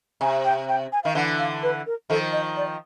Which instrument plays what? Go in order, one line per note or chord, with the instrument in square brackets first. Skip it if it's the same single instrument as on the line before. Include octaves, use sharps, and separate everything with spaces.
[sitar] C3 [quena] G#5
[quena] G5
G5
G#5
[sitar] D#3 [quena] F5
[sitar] D3 E3 [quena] F#5
[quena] F5
B4
A#4
[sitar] D#3 F3 [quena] A4
[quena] D#5
D5